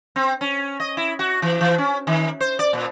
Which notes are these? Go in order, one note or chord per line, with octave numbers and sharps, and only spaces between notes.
C4
C#4
D#5
E4
F#4
E3
E3
C#4
D#3
C5
D5
A#2